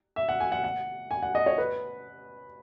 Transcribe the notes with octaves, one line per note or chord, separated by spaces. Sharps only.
E5
F#5
G#5
F#5
F#5
G#5
F#5
D#5
C#5
B4